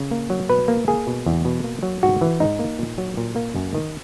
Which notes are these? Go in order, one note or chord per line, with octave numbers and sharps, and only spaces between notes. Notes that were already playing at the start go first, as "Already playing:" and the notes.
Already playing: C#3
A#3
F#3
B2 B4
A#3
A#3 G#4
B2
E2
B2
A#3
F#3
G#2 F#4
E3
G#2 D#4
A#3
A#2
F#3
A#2
A#3
F#2
D#3